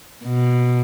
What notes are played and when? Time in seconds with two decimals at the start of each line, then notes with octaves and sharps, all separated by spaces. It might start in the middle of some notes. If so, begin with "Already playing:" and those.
0.25 B2